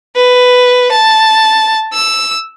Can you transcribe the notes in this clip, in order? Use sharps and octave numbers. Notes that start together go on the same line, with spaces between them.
B4
A5
E6